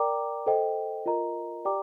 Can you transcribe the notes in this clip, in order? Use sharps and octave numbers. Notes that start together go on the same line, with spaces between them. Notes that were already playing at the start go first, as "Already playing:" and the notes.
Already playing: A#4 D5 G5 A#5 D6
A4 C5 D#5 G5
F4 A#4 D#5 A#5
G4 D5 G5 A#5 D6